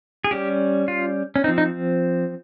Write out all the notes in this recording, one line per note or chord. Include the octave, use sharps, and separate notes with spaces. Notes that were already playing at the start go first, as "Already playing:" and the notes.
G#4
G3 C#4 G4
F4
C#4
F3 C4 D#4
D#4